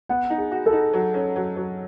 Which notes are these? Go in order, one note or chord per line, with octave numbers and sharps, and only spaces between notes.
B3 F#5
D#4
G#4
F#4
A4
D#4
F#3
C#4
F#3
F#3